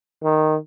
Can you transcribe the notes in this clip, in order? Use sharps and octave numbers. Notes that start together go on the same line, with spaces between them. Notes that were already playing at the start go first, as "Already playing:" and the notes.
D#3